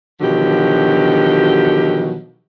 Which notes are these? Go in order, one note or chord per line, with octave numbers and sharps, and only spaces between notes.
B2 D3 D#3 F3 F#3 G4